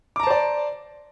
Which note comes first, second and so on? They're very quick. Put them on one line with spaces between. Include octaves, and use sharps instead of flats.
D6 A#5 A5 C5 D5